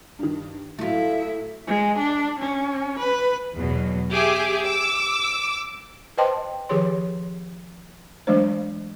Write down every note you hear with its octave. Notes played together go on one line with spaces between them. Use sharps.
G2 D#3
A2 F#3 A3 E4 F4 E5
G#3
D4
C#4
B4
E2 B2 F#3
G4 G#4 E5 D6
D6 E6
B4 C5 D#5 G5 A5 C6
D#3 F3 G4 G#4 C#5 C6
E3 F#3 G#3 A3 D4 C5